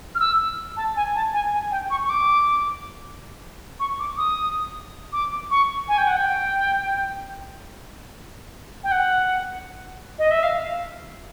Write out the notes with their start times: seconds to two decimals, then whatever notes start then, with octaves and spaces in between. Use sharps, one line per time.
0.15 F6
0.20 E6
0.77 A5
0.96 G#5
1.15 A5
1.34 G#5
1.53 G#5
1.71 G5
1.90 C#6
2.05 C#6
2.10 D6
3.80 C#6
3.99 D6
4.18 D#6
5.13 D6
5.51 C#6
5.88 G#5
5.98 G5
6.07 F#5
6.17 G5
8.84 G5
8.91 F#5
10.19 D#5
10.31 E5
10.43 F5